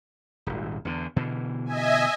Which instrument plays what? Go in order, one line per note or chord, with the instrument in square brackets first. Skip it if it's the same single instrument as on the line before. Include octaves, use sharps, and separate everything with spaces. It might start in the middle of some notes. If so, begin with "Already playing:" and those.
[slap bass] D#1 G#1
E2 D3
B2 D3 E3
[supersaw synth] D#5 E5 G#5